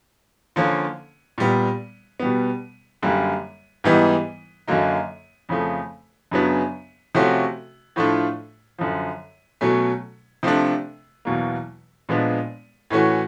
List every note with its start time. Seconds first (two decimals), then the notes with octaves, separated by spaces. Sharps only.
0.56 D3 F3 A#3 C#4
1.38 A#2 G3 B3
2.20 B2 G3 B3
3.02 F#2 D3 G3 A#3
3.84 G#2 E3 G3 B3 D#4
4.68 F#2 D3 F#3 A#3 D#4
5.49 F2 C#3 F3 A3
6.31 F#2 C#3 F#3 B3 D4
7.15 C3 F3 A3 C#4 F#4
7.96 A2 F3 A3 D4 F4
8.79 F#2 D3 F3
9.61 B2 F#3 A3 C#4
10.43 C3 F3 A3 D4
11.25 E2 B2 F#3 A#3
12.09 A#2 F3 G#3 B3 D4
12.90 A2 E3 A3 C#4 F#4